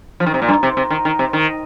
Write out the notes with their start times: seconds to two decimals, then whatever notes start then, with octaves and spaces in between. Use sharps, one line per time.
0.20 F3
0.26 D#3
0.34 C3
0.42 A#2
0.48 G2
0.63 C3
0.77 C3
0.90 D#3
1.05 D#3
1.19 C3
1.33 D#3